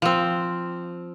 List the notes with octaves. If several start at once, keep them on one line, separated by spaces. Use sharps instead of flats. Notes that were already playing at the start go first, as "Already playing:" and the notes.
F3 C4